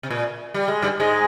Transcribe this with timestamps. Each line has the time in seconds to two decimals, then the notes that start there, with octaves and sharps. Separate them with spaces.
0.03 C3
0.10 A#2
0.54 G3
0.68 G#3
0.82 G2 G3
1.00 G#2 G#3